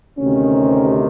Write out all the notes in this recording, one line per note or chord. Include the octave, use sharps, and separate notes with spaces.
D2 C3 D#3 C#4